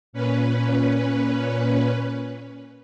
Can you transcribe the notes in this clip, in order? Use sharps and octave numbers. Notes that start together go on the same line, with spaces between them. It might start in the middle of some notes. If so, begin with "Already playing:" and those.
A#2 C#4 B4